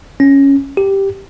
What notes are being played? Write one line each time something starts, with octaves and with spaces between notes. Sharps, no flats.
C#4
G4